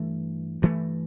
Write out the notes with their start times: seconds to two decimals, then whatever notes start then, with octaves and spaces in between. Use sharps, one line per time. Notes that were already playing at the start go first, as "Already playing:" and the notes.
Already playing: G2 E3 A3
0.62 G2 E3 A3